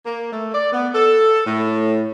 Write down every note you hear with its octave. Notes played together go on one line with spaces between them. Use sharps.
A#3
A3
D5
B3
A4
A2